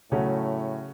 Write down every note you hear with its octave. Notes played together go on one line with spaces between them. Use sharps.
A2 C#3 F#3 A3 C#4 F#4